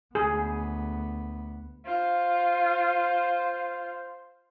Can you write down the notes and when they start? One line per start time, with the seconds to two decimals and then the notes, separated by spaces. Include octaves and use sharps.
0.15 D2 B3 G#4
1.86 F4 C5